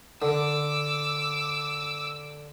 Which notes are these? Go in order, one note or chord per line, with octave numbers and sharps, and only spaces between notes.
D3 D6 E6